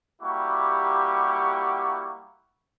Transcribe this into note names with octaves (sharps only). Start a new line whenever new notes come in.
G3 A#3 E4 F#4 G4 C#6